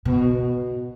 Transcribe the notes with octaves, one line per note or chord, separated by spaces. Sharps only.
B2